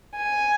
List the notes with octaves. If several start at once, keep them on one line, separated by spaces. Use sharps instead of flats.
G#5